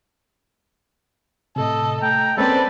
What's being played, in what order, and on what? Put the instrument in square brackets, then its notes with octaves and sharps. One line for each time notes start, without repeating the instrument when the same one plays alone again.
[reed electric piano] A2 C3 [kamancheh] A4 D#5
[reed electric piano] A3 [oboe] G5 [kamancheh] A#5
[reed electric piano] G#3 A#3 [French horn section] C4 C#4 [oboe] A4 [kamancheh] B4 D5